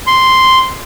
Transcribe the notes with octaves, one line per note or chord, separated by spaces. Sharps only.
C6